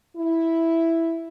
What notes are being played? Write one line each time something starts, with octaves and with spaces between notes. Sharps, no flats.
E4